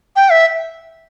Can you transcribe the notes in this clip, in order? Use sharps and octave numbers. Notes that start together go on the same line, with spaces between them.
G5
E5